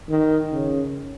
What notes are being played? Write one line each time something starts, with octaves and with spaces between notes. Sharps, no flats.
D#3
C#3